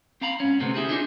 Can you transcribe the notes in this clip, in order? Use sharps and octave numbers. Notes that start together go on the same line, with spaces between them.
C4 F5 A#5 B5
G#2 C#4
D2 C3 A3 B3 C4
D#4 E4 G4 G#4
D4 D#4 F4 G4 G#4